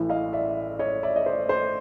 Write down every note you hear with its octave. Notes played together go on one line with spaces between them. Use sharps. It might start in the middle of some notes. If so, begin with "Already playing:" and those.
Already playing: A1 A2 E3
D#5 F5
D5 E5
C#5 D#5
D5 E5
D#5
C5 D5
C5 D5